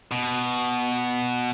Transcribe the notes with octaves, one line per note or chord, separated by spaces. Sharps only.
B2